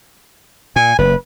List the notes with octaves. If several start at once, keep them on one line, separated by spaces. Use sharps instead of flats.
A#2 G#5
F#1 B4